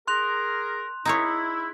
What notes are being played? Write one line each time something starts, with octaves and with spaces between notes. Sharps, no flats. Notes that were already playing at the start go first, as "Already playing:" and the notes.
G#4 A#4 C6 F#6 F7
D#4 E4 G#4 C#5